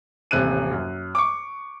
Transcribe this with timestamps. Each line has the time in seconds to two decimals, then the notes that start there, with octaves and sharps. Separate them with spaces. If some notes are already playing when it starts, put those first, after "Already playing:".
0.31 D#1 A1 C3 F#6 D#7
0.71 F#2
1.15 C#6 D6